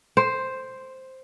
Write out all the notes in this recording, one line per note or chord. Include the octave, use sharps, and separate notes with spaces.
C5